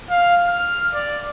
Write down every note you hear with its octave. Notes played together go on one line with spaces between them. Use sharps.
F5
F6
D5